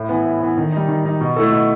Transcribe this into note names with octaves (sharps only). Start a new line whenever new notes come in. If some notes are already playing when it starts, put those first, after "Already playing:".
Already playing: A2
E3 B3
A2
E3 B3
D#3
G3 D#4
D#3
G3 D#4
B2
A3 E4 A4
B2